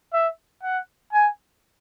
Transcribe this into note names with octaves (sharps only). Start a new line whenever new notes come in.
E5
F#5
G#5